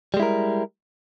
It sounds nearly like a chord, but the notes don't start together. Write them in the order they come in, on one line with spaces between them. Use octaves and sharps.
G3 G#3 E4 A#4